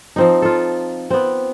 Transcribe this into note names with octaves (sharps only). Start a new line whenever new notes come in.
F3 C4 D#4
F4 A4
B3 C4